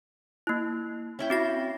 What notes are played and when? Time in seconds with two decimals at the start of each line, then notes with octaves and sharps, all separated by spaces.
0.47 A#3 E4
1.19 C#4 E4 G5
1.30 C4 F#4 A#6